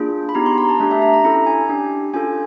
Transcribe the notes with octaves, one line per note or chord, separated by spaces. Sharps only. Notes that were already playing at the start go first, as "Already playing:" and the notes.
Already playing: A#3 D4 F4 G#4
B5
B3 D#4 G4 A#5
C6
A#5
A5
A3 D4 G4 A5
E5
A#5
A#5
C#4 E4 A4 A#5
G#5
D4 G4
C#4 F4 A4 G#5